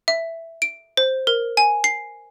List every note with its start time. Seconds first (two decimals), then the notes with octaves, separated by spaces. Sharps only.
0.08 E5
0.62 D7
0.97 C5
1.27 A#4
1.57 G#5
1.84 C7